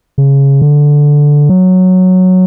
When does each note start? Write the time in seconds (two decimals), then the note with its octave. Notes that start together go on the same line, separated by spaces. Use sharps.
0.18 C#3
0.62 D3
1.49 F#3